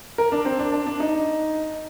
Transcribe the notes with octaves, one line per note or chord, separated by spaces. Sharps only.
A#4
D4
C4
D4
D4
D4
D#4